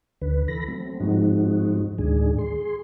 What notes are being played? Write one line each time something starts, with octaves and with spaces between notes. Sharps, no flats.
D2 D3 B4
E3 A4 B5 A#6
F#3 A3 C4
G#2 F3 G#3 C4 D#4 F#4
D2 A2 D#3 G#3 D4 G#4
G#4 C6